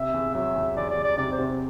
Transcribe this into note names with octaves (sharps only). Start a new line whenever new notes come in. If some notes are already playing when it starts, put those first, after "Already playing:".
Already playing: C3 E5
E2
F#3 E5
E2
E2 D5
D5
E2
D5
C3 D5
C5
C3